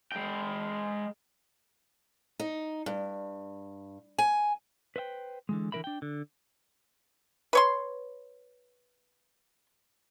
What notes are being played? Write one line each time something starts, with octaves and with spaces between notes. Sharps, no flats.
G#3 G5
D#4
G2
G#5
B4 C5 E5 G5
D3 E3 G#3
D3 E3 G#3 A#4 E5 B5
D4 G5
D3
B4 C#5 C6